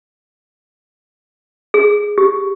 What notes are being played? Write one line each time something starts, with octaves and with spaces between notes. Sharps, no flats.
G#4
G4